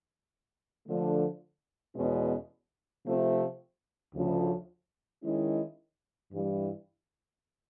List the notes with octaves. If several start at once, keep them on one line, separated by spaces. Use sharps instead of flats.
D3 F3 A3
E2 B2 G#3 C#4
C3 F3 A3 C4 F4
D2 C#3 F3
D#3 G#3 C#4 E4
G2 E3 G3